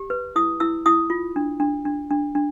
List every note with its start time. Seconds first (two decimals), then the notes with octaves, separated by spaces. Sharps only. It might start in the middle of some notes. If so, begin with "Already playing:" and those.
Already playing: G4
0.10 B4
0.36 E4 D#6
0.60 E4 E6
0.86 E4 D#6
1.10 F4
1.36 D4
1.60 D4
1.85 D4
2.11 D4
2.35 D4